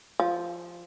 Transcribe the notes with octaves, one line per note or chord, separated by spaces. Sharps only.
F3